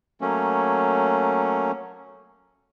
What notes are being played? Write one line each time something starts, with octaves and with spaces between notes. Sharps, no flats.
F#3 A3 A#3 C#4